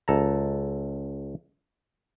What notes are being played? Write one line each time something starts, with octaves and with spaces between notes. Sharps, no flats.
C#2 A4 A5 A#5